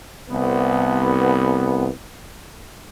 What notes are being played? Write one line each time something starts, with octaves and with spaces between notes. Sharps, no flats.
C2 B3